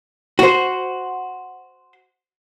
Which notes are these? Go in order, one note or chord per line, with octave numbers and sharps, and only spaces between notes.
F#4 C5